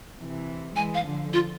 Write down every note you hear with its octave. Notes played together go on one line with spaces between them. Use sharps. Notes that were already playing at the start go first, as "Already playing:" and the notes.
C3 E3
E3 G#3 G#5
F5
D3 F3
F4